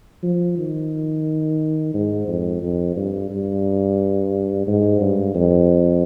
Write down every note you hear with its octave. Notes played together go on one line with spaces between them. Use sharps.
F3
D#3
G#2
F2
F2
G2
G2
G#2
G2
F2